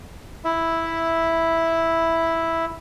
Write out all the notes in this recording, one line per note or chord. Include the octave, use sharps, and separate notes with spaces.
E4 E5